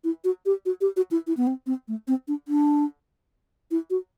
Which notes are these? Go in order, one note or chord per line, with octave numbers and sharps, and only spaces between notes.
E4
F#4
G4
F#4
G4
F#4
E4
E4
B3
C4
C4
A3
C4
D4
D4
E4
F#4